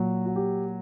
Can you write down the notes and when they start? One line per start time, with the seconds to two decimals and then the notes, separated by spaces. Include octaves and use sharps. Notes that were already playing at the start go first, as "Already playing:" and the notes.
Already playing: A#2 F#3
0.26 F#4
0.36 G4